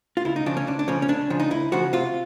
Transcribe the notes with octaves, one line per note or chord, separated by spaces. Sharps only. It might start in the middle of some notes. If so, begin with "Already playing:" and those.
F4
C#2 E4
D#4
C#3 F3 D4
C#4
C#2 D4
D4
C#3 F3 C#4
C#4
C#2 D4
C#3 F3
D#4
C#2 E4
C#3 F3 F#4
C3 F4